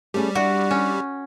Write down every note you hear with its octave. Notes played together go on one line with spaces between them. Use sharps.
G3 A3 C#4 G#4
D4 E4 F#4 F#5
C#4